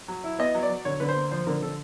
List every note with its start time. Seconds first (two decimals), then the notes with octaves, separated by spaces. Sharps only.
0.08 F#3
0.24 E4
0.39 B3 D#5
0.55 F#3
0.63 D5
0.69 F#3
0.85 D3 C#5
1.00 D3 B4
1.09 C5
1.16 A#3
1.31 F3 C5
1.47 D3 A#4
1.62 D3 A4